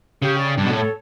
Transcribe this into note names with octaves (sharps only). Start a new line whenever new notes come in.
C#3 G4
D5 G5
G2 D4
B2
A2
A4 C#5